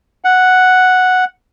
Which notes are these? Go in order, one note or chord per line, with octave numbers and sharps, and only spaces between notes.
F#5